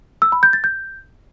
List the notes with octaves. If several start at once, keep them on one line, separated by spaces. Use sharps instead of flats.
E6
B5
G6
A6
G6